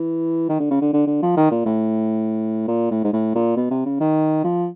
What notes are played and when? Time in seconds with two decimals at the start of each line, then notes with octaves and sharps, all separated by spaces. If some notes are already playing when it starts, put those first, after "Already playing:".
Already playing: E3
0.49 D#3
0.60 D3
0.71 C#3
0.82 D3
0.93 D3
1.07 D3
1.22 F3
1.37 D#3
1.51 A#2
1.66 A2
2.68 A#2
2.91 A2
3.04 G#2
3.13 A2
3.35 A#2
3.57 B2
3.71 C3
3.86 C#3
4.01 D#3
4.44 F3